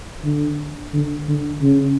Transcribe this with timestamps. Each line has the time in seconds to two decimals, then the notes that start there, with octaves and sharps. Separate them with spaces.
0.24 D3
0.93 D3
1.28 D3
1.61 C#3